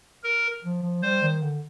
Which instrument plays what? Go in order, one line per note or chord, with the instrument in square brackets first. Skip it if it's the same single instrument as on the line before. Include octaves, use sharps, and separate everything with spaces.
[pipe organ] A#4
[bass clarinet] F3
F3
[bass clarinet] G3 [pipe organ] C5
[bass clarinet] D#3
D3